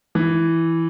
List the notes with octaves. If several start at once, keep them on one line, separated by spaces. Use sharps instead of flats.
E3